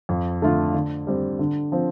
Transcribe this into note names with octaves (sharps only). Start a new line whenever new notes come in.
F2
D3 A3 F4
D3
G3 C4
D3
F3 C4